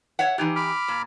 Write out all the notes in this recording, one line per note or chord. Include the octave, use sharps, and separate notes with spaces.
C#5 E5 F#5
E3 D#4 G4
B5 D6 F6
A#2